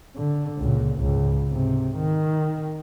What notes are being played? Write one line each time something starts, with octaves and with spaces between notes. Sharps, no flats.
D3
C#2 A#2
C#2 G#2
G#2 C3
D#3